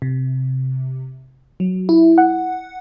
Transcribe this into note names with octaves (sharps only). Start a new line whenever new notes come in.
C3
F#3
E4
F#5